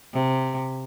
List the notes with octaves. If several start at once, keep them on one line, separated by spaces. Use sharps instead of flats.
C3